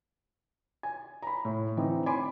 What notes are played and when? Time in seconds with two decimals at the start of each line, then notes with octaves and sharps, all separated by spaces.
0.83 G#5
1.22 A#5 B5
1.45 A2
1.77 D3 E3 C4 D#4
2.06 G#5 B5 C6 D6